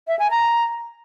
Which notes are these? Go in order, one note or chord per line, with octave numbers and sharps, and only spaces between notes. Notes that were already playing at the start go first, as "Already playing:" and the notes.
E5
G#5
A#5